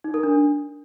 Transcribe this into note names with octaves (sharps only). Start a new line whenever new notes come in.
D#4
A#4
D4